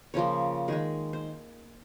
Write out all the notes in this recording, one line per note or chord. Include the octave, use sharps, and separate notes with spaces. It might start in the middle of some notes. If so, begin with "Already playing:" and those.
C#3 F3 A#3 C#5
D#3 G#3 G#4
C5